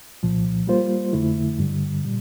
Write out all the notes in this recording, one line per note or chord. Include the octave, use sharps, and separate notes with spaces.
C2 A#2 F3
G3 A#3 F4 C5
F2 D3 A3 E4
G2 D3 G3
A#2 G3